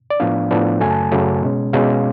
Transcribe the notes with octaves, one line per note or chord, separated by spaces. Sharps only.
D5
A2 F3 B3 D4 F5
A2 F3 B3 D4
F#2 C#3 F#3 A3 G#5
A5
F#2 C#3 F#3 A3
B2 G#3 C#4
B2 G#3 C#4 F5